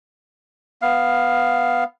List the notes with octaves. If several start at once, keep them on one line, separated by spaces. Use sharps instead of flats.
B3 F5